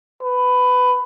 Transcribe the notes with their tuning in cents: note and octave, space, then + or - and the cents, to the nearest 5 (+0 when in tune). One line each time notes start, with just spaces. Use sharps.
B4 +15